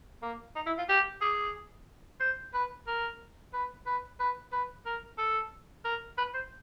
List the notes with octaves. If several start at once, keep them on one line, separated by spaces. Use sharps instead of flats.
A#3
D#4
E4
F4
G4
G#4
C5
B4
A#4
B4
B4
B4
B4
A#4
A4
A#4
B4
C5